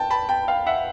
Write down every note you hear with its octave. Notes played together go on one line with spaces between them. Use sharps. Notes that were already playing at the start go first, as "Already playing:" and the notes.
Already playing: G5 A5
A5 B5
G5 A5
F5 G5
E5 F#5